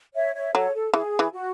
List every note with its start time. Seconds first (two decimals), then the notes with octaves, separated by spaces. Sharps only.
0.15 C#5 E5
0.34 C#5 E5
0.54 F#3 A4 C#5
0.74 A4
0.93 E3 G#4
1.19 E3
1.33 F#4